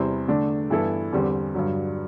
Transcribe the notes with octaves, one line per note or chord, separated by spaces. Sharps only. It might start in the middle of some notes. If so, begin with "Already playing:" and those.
Already playing: E2 C3 G3 C4 E4
D3 A3 D4
G2 E3 B3 E4 A4
E2 D3 G3 C4 G4
G2 D3 F#3